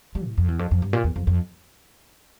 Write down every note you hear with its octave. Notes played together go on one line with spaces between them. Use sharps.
G3
A2
F2
E2
F2
F2
G2
A#2
E2
F2
F2